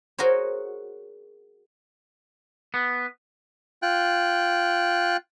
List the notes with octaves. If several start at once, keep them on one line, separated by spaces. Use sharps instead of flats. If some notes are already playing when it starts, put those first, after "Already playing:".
F#4 G#4 A#4 C5 C#5
B3
F4 G5 F#6